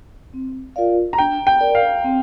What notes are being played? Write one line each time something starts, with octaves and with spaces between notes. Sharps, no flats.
C4
F4 A#4 D5 F5
A#5
D4 G5
G5
A#4 D5
F5
C4